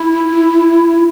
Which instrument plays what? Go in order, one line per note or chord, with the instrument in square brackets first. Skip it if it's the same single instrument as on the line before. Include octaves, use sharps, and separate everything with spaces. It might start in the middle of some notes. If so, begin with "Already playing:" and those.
Already playing: [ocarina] E4